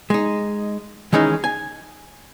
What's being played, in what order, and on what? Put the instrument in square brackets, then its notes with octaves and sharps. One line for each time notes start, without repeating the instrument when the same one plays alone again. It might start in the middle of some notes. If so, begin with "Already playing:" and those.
[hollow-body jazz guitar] G#3 D#4
D#3 E3 G#3 C#4 D#4
G#5